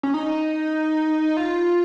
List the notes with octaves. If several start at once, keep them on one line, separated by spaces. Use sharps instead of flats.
C#4
D#4
F4